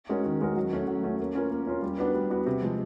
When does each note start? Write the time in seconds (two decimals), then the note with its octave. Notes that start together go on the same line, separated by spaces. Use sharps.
0.09 G#3 C#4 F#4 A#4
0.25 D#3
0.41 G#3 C#4 F#4 A#4
0.56 F#3
0.73 A3 C#4 F#4
0.87 F#3
1.03 A3 C#4 F#4
1.20 A#3
1.35 C#4 F4 A#4
1.51 A#3
1.67 C#4 F4 A#4
1.82 G3
1.98 B3 D4 F#4 B4
2.15 G3
2.30 B3 D4 F#4 B4
2.46 C3
2.62 F3 G#3